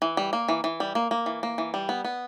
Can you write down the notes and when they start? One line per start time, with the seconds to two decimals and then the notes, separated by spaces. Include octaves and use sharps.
0.02 E3
0.17 G3
0.33 A#3
0.49 E3
0.64 E3
0.80 G3
0.95 A#3
1.11 A#3
1.26 E3
1.43 A#3
1.58 E3
1.74 G3
1.89 B3
2.05 B3